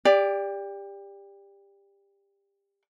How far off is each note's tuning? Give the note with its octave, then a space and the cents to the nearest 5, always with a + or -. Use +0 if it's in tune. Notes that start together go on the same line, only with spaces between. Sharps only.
G4 +25 D5 -5